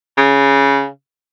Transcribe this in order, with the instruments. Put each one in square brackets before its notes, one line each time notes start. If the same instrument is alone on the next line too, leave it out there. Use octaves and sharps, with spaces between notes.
[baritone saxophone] C#3